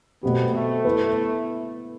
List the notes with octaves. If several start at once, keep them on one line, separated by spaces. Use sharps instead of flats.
B2 A3 B3 C4 G4
A3
B3 E4 A4